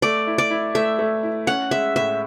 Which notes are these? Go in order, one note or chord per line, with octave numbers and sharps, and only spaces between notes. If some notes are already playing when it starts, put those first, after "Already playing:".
A3 D5
E4
D5
E4
A3 E5
A3
E4
C#4 F#5
G#3 E5
A2 E5